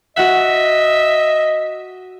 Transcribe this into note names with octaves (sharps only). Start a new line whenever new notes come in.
F#4 D#5 E5 F#5